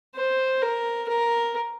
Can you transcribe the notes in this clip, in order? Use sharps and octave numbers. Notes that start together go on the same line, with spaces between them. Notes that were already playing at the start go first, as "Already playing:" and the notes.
C5
A#4
A#4